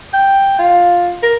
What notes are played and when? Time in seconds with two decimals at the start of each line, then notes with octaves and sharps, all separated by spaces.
0.13 G5
0.59 F4
1.23 A#4